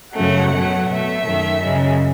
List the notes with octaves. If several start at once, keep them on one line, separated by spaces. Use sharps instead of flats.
F#2 C#3 F#3 A3 F#5
B2 F#3 A3
B2 A3 E5
F#2 D#3 A3
F#2 C#3 G#3